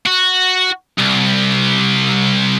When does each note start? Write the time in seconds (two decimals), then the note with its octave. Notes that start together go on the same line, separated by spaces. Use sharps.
0.06 F#4
0.98 C2